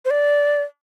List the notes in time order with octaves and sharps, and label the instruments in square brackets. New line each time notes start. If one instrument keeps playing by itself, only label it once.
[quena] C5
D5